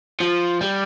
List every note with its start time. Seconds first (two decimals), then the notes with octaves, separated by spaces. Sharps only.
0.20 F3
0.61 G3